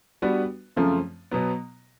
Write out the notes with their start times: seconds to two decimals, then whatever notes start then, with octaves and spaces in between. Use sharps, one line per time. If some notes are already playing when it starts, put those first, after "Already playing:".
0.22 G3 B3 D4 F#4 B4
0.76 F#2 C#3 F3 A3 C4
1.31 B2 F#3 B3